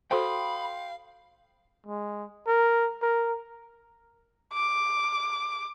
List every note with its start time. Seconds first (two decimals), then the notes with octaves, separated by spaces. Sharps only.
0.11 F#4 A4 C5 F5 G5 B5 C6 D#6
1.87 G#3
2.47 A#4
3.03 A#4
4.54 D6